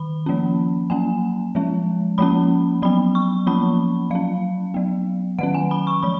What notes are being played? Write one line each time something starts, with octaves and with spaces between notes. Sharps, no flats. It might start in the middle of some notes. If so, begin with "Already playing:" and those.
Already playing: D#3 B5
F3 A#3 C#4
F#3 A#3 C#4 G#5
F3 G#3 C#4
F3 A#3 C#4 B5
F#3 B3 B5
C#6
F3 A#3 C#4 B5
F#3 C#4 F5
F#3 B3
D#3 F#3 C#4 F#5
G#5
B5
C#6
F3 B5